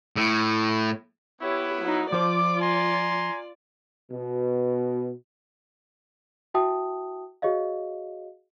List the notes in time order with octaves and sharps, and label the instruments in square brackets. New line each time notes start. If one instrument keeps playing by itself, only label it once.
[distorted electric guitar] A2
[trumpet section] B3 E4 [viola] G4 C#5
[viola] F#3 D#4
[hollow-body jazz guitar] F3 C5 [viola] F4 D5 [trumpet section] D6
[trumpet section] G#5 A#5 C6
[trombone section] B2
[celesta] E4 F#4 E5 G5 A5 D#6
F#4 G#4 C#5 D#5 F5